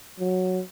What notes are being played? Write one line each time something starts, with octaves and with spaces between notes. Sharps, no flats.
F#3